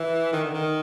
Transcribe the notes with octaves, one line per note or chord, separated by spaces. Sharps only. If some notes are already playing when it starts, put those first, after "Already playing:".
Already playing: E3
D#3
D3
D#3